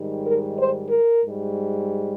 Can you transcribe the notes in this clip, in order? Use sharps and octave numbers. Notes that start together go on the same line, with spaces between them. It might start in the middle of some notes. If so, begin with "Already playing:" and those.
Already playing: G#2 D#3 G3
A#4
C5
A#4
G#2 G3